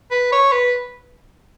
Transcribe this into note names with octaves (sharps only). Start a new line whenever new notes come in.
B4
C#5
B4